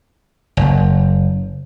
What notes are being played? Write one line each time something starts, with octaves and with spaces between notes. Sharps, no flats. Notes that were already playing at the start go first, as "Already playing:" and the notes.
F#1